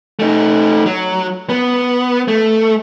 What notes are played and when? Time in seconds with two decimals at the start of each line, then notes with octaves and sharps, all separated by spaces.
0.20 A3 D#4
0.86 F#3
1.49 B3
2.28 A3